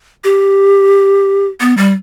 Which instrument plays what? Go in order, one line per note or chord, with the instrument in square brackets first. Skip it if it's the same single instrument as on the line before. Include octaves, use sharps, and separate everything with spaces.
[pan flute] G4
B3
G3